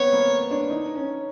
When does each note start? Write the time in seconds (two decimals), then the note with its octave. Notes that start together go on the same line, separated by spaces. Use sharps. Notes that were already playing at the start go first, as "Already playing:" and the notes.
Already playing: B3 C4 C#5
0.13 A#3
0.51 D4
0.70 D#4
0.95 C#4